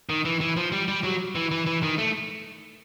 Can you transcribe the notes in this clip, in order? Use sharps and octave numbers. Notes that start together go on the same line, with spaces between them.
D#3
E3
E3
F3
G3
G3
F#3
E3
E3
E3
D#3
A3